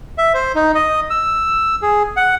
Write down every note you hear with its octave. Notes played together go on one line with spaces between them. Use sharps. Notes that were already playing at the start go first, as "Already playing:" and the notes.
E5
C5
D#4
D#5
E6
G#4
F#5